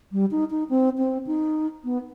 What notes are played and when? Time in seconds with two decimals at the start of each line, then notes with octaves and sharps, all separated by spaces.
0.12 G3
0.31 D#4
0.50 D#4
0.69 C4
0.98 C4
1.27 D#4
1.84 B3